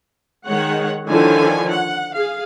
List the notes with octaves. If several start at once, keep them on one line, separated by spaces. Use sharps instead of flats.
D#3 G#3 C#5 F#5
D3 D#3 F3 E4 C#5 G#5
F#5
G#4 F5